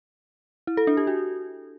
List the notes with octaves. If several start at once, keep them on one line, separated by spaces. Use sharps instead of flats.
E4
A4
D4
G4
F#4